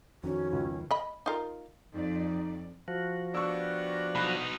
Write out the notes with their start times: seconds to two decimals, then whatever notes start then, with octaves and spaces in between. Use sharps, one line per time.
0.23 F2 D#3 C#4 F#4
0.53 C#2
0.91 D#5 B5
1.26 D#4 F4 A#4
1.93 F2 D#4 D5
2.88 F3 F#4
3.35 B3 D4 G4 C#6 E6
4.15 B2 D#4 B5 F#6